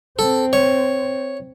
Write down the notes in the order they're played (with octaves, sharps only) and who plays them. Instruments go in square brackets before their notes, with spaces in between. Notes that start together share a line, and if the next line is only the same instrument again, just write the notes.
[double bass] C4 [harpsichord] A4
[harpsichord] C#5